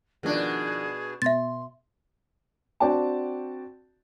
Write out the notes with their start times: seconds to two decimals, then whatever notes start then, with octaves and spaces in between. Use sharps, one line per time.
0.23 B2 D#3 F3 D4 G#4 C#6
1.22 B2 E5 C6 A6
2.80 C4 D4 F#4 D5 G5 A5